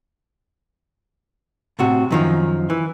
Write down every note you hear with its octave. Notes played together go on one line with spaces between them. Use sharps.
A2 C3 F#4
F#2 D#3 F3
E3